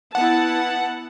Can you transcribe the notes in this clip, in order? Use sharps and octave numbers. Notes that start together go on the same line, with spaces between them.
B3 E4 F#5 A5